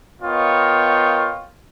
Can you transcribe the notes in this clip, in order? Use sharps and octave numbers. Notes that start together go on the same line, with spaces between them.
B3 F4 A#4 C#5 D#5 G5